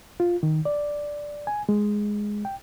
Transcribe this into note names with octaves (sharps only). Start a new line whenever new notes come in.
F4
D#3
D5
G#5
G#3
G5